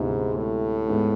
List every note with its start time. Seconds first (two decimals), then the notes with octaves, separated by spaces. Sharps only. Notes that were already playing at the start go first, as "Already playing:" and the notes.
Already playing: D2 G#2 C3 G#3 B3 E4
0.36 A2
0.88 G#2 G#3 B3